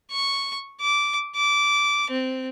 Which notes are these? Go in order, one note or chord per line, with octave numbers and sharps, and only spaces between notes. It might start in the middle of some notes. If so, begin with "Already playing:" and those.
C#6
D6
D6
C4